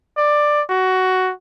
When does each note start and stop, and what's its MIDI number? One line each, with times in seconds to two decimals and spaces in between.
0.17 0.62 74
0.69 1.32 66